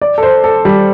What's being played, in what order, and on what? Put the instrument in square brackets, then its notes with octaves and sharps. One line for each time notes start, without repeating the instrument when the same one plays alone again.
[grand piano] D5
A4
C5
A4
G3